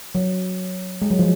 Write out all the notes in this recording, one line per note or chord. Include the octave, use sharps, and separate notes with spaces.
F#3
G#3
F#3
F3